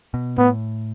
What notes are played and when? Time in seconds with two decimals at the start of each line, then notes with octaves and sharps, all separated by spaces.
0.14 B2
0.38 A2 B3